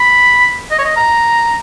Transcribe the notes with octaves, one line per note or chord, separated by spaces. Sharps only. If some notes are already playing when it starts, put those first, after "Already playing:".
Already playing: B5
D#5
C#5
D#5
A#5